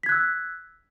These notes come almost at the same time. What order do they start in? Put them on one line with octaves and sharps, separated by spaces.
B6 G#6 F#6 E6